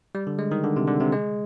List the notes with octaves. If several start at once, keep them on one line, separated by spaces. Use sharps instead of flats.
G3
D3
G#3
D#3
D3
C3
D3
C3
G#3